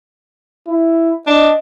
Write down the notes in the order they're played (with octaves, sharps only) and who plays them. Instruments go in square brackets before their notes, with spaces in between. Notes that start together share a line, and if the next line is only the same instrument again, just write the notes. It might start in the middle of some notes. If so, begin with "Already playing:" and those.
[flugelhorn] E4
[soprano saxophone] D4 [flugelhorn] D#5